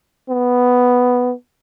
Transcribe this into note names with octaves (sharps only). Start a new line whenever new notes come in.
B3